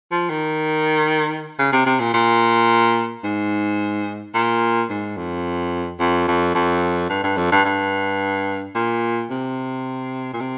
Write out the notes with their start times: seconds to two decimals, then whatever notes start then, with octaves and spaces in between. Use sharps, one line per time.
0.11 F3
0.30 D#3
1.59 C#3
1.72 C3
1.86 C3
2.00 A#2
2.14 A#2
3.24 G#2
4.34 A#2
4.90 G#2
5.17 F2
6.00 F2
6.27 F2
6.55 F2
7.09 G2
7.24 G2
7.37 F2
7.52 G2
7.65 G2
8.75 A#2
9.30 C3
10.33 A#2
10.41 C3